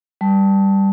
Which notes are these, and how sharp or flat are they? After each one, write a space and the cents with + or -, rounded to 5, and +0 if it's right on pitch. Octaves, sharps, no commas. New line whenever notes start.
G3 +0 A5 +0